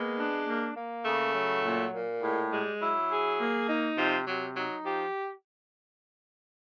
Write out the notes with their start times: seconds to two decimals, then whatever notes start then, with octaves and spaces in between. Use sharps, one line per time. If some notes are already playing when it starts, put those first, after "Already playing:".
Already playing: G#3 A#3 B3
0.18 D4
0.47 A#3
0.75 A#3
1.05 C#3 A3
1.34 F#3
1.63 A#2
1.92 A#2
2.22 A2 G#3
2.51 G3 G#3
2.81 F#3 E4
3.10 G#4
3.40 A#3
3.68 D#4
3.97 C3 F3
4.27 C3 F#3
4.56 F#3 D#4
4.85 F3 G4